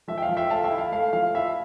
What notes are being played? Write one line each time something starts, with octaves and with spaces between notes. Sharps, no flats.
F3 E5
G5
F5
F3
E5 G5
A3 F5 A5
E5 G5
E4
F5
A3 F5
F3 F5
E4 E5